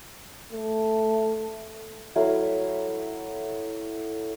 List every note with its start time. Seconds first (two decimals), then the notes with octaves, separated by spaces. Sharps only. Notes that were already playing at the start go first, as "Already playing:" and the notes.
0.52 A3
2.15 F#3 A3 E4 F5